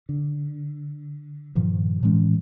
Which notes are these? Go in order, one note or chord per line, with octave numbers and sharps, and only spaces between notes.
D3
G2 A#2 D#3 F3
A2 E3 G#3 C#4